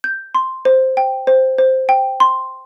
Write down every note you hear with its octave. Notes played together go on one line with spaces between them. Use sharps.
G6
C6
C5
G5
C5
C5
G5
C6